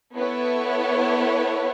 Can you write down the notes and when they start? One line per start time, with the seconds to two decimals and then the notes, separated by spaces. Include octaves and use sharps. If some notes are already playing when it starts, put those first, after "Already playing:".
0.15 B3 E4 A4 C#5